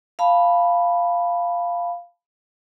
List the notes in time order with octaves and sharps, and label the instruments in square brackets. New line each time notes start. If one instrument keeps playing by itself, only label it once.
[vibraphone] F5 A5 B5